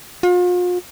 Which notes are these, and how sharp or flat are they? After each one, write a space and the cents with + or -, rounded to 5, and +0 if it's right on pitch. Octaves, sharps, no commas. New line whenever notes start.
F4 +40